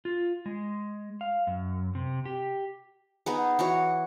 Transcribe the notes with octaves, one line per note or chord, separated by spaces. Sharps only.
F4
G#3
F5
F#2
C3
G4
B3 D#4 G#4
E3 F#4 C#5